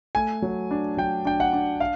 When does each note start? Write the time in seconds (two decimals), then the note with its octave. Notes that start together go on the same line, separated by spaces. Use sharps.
0.15 A3 G#5
0.42 F#3
0.71 D4
0.97 F#3 G5
1.25 D4 G5
1.40 F#5
1.53 D4
1.80 F5